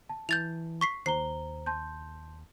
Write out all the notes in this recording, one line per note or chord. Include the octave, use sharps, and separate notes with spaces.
A5
E3 G6 A6 F7
C#6 B6 C7
D#2 C5 A#5 C7 G7
A5 C6 G6